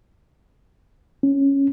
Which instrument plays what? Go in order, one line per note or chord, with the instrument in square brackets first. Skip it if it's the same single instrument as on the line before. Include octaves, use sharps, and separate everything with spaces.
[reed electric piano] C#4